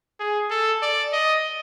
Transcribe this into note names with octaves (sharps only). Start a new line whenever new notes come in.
G#4
A4
D5
D#5